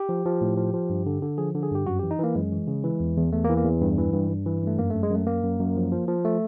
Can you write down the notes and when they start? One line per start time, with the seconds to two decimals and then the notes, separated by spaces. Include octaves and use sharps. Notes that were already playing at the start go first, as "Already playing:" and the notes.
Already playing: G4
0.09 F3
0.26 F3
0.41 A2
0.57 F3
0.74 F3
0.90 G2
1.06 D3
1.22 D3
1.38 F3 G#4
1.55 D3
1.63 G#4
1.71 G2 G4
1.86 F#2 F#4
1.99 E3 G4
2.11 D#4
2.19 E3 A#3
2.35 F#2 G#3
2.52 E3
2.67 C#3
2.84 E3
3.00 E2
3.17 E2
3.33 E2 A3
3.44 A#3
3.49 E3
3.57 A#3
3.65 E2
3.81 G2
3.98 E3
4.13 G2
4.31 G2
4.46 E3
4.63 G2 A3
4.78 F#2 A#3
4.90 F#2 A3
5.03 G#3
5.11 F#2 A3
5.27 F#2 A#3
5.43 F#2
5.60 F#2
5.76 F3
5.92 F3
6.08 F3
6.25 A3